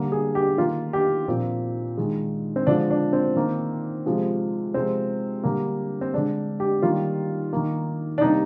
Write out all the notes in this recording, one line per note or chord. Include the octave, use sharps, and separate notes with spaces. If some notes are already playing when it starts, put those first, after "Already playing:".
Already playing: D3 G3 A#3
G#4
G4
D#3 A#3 F4
G4
A#2 F3 A#3 C4
D#3 G#3
C4
D3 F3 G#3 D4
D4
C4
D#3 A#3
C3 F3 G#3
C3 F3 G#3 C4
D3 G3 A#3
C4
D3 G#3 D4
G4
D#3 G3 A#3 F4
D#3 A#3
D4
C3 G3 A#3 D#4